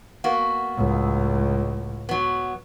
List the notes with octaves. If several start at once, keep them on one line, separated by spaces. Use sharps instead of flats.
A#3 B3 F#4
C#2 A2
F#3 B3